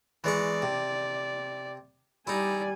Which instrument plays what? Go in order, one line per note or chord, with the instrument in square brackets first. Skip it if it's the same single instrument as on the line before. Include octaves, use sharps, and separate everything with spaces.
[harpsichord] E3 G#3 C#6 [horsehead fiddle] D5
[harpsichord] C3
[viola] G3 G#5 [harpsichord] D#4 E4 [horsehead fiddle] D5